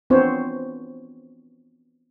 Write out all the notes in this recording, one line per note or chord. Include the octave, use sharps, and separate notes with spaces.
B3 C4 D4 F4 C5 C#5